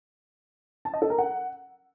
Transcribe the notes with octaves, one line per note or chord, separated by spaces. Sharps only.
A5
D#5
A4
A#4
F#5